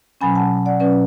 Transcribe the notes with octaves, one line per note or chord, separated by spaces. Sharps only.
B2 F#3 C#4 G#5 B5
F#5 A5
D5 F#5
B2 F#3 C#4 B4 D5